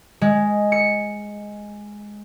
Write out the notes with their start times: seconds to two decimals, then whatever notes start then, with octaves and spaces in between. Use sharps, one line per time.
0.21 G#3
0.72 C#7